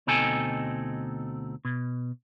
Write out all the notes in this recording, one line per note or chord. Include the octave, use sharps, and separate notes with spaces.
D2 B2 C4 D#4 A4 G#5
B2